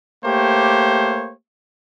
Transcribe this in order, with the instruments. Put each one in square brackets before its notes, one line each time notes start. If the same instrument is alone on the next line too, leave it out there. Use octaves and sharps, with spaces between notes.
[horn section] A3 A#3 G4 C5 C#5